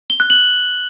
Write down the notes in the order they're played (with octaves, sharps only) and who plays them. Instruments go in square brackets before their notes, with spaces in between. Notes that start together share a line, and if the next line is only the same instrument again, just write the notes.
[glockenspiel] G7
F#6
F#7